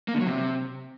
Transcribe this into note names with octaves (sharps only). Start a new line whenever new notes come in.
A#3
D3
F#3
C3